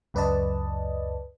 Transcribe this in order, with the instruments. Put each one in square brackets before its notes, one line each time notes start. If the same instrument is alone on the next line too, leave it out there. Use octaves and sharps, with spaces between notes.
[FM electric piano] C#2 F#2 B4 D5 D#5 A5